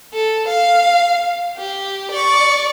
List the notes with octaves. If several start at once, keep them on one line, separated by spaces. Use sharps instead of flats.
A4
F5
G4
D5 C#6